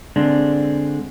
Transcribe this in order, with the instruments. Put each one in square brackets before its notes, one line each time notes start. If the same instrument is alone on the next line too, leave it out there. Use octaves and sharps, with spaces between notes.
[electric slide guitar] D3 G#3 C4 D4